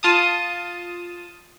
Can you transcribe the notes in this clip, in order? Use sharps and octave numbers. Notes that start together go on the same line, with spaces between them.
F4 A5 D#6